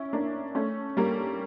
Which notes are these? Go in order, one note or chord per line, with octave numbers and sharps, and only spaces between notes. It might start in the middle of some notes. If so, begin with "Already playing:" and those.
Already playing: C#4 E4
A#3 D4
A3 C#4
G3 A#3